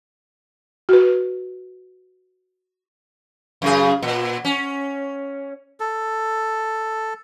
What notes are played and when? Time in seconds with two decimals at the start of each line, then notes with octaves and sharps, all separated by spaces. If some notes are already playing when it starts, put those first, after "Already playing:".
0.89 F#4 B4
3.62 F#2 C#3 G#4
4.03 A#2
4.45 C#4
5.80 A4